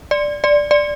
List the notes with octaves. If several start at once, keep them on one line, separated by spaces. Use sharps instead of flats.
D5
D5
D5